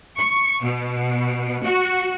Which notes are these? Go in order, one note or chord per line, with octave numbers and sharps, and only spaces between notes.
C#6
B2
F#4